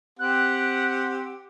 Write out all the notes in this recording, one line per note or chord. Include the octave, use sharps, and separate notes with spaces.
C4 G4 F#5 F#6